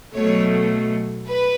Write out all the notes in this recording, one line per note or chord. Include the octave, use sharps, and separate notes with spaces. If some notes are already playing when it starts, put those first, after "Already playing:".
B2 F#3 A3 C#5
B4